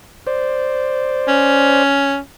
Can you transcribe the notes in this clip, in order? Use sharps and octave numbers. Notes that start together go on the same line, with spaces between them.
C5 D5
C#4